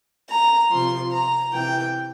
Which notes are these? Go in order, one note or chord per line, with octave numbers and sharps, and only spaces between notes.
A#5
C3 F3 C6
A#5
C3 E3 G5